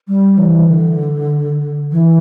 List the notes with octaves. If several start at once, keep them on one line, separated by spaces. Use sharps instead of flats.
G3
E3
D3
E3